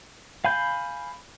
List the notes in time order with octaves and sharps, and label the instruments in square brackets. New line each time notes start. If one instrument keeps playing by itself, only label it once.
[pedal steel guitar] F5 G#5 B5 G6